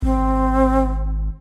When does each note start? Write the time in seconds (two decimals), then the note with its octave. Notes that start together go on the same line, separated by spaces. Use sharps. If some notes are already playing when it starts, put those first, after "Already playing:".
0.02 G#1 C4